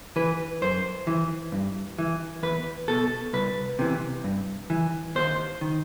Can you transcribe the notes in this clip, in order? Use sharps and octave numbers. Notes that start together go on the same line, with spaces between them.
E3 B4
F#2 C5
E3
G2
E3
E2 B4
B2 A4
C2 B4
C3 E3
G2
E3
D#2 C5
D#3